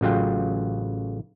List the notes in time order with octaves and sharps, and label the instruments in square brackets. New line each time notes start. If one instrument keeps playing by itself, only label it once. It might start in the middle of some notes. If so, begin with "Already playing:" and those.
[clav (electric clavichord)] A1 C#3 F#3 F4 G5